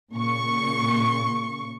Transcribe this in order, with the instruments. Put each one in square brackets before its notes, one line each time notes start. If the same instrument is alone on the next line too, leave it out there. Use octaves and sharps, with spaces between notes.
[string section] A#2 C#3 C#6